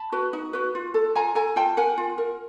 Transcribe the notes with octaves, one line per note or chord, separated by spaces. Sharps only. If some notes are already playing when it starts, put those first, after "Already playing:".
Already playing: A5 B5
F#4 B4
D#4
F#4 B4
F4
A4
F4 G#5 A#5
A4 G#5 A#5
F4 G5 A5
A#4 F#5 G#5
F4
A#4